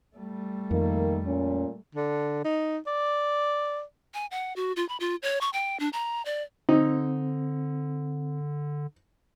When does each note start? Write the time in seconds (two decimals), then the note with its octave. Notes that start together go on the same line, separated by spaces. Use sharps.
0.16 G3 A3
0.71 F2 D#3 A#3
1.26 A#2 C#4
1.95 D3
2.45 D#4
2.87 D5
4.14 G#5
4.31 F#5
4.56 F#4
4.76 F4
4.89 B5
5.00 F4
5.23 C#5
5.41 C#6
5.53 G5
5.80 D4
5.93 A#5
6.25 D5
6.69 D3 C4 D#4